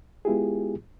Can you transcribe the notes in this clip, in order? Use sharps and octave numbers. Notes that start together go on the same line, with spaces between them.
G#3 B3 E4 F4 G4 G#4